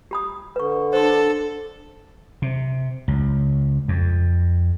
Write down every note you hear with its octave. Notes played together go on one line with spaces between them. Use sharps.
G4 B5 D#6
D3 B4 C#6
D4 A4 C5 C6
C3
C#2
F2